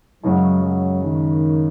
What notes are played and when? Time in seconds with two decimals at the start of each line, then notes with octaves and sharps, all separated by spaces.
0.24 F#2 C#3 F#3 G#3 C#4
0.63 F#3
1.03 D#3